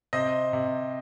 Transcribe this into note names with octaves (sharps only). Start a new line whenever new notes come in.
C3 C5 D#5
C3